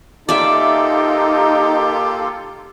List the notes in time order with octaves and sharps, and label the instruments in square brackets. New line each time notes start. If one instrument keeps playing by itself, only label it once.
[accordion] A#3 F4 A4 [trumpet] D#4 [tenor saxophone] G4 [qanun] D5 E5